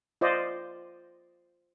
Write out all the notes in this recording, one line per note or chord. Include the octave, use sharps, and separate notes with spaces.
F4 C5 D5 D#5